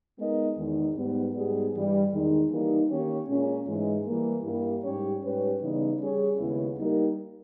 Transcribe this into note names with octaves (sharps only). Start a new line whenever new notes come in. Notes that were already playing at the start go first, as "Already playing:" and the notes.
G#3 B3 D#4 A#4 D#5
E2 D#3 G#3 D#4
G#2 G3 B3
G#2 G3 B3 D#4 G#4
G2 E3 G3
E2 D#3 G#3 D#4
E3 G3 A#3 D#4
D#3 A#3 C#4 G4 C#5
A#2 G#3 C#4
G#2 E3 G#3
E3 G3 A#3
G2 G3 A#3 E4 G4
G#2 G3 C#4 G4 C#5
G#2 G3 C#4 G4 B4
C#3 E3 G3 B3 D#4
G3 C#4 G#4 C#5
D#2 C#3 G#3 B3 E4
G3 A#3 D#4 G4 A#4